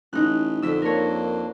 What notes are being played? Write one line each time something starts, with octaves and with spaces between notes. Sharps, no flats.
A1 D#4 F#6
F2 D3 E6 B6
A#3 D4 A#4 C#5